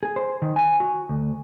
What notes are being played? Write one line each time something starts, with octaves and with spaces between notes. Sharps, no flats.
G#4
C5
D#3
G#5
F#4
D2